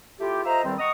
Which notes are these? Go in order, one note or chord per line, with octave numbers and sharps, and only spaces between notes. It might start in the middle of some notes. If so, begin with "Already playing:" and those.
A3 E4 F4 G4
F4 A4 C5 D#5 E5 A#5
E2 D#3 G3 C4
D#5 F#5 A#5 C#6 D#6